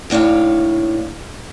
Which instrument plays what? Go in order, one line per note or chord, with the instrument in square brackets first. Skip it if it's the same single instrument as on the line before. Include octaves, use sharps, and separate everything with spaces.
[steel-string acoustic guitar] D#2 A2 D4 C#5 F5